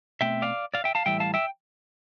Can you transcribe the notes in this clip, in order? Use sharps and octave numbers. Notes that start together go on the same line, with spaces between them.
B2 A3 C4 E5 G5
D5 F5
D5 F5
E5 G5
F5 A5
A2 E3 G3 E5 G5
F5 A5
E5 G5